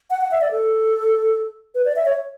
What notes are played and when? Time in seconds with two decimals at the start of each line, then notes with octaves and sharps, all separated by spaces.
0.10 F#5
0.21 F#5
0.31 E5
0.41 D5
0.51 A4
1.75 B4
1.85 D5
1.96 E5
2.05 C#5